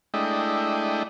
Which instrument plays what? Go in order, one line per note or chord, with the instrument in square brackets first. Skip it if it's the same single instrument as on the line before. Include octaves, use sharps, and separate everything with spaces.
[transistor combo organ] G#3 A3 D4 E4 D#5 G5